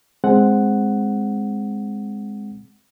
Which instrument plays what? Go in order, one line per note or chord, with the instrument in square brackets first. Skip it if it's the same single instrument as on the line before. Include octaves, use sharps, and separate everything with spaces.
[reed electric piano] G#3 C4 F#5